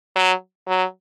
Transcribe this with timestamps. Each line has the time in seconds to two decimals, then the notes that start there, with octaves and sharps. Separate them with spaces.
0.16 F#3
0.68 F#3